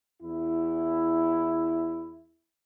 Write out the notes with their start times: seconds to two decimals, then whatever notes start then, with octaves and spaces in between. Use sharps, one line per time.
0.21 E2 E4